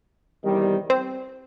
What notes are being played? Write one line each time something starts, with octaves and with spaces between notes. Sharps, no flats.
E2 C3 D#3 G3
C4 C5